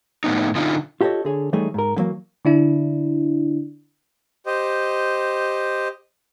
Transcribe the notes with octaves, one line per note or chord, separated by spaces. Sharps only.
A2 B3 D#4
D3 D#4 F4
F4 G4 A4 C5 C#5 D#5
D3 G#4 C#5
E3 G3 A3 D#4 G#4 C#5
G#2 A#4
D3 E3 F#3 A#3
D3 D4 E4
G4 C5 D#5